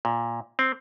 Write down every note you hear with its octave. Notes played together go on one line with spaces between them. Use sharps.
A#2
C4